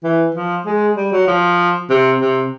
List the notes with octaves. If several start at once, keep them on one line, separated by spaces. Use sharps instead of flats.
E3
F3
G#3
G3
F#3
F3
C3
C3